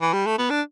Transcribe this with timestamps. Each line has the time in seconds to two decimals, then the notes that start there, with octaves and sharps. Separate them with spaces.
0.01 E3
0.13 G3
0.26 A3
0.38 B3
0.50 D4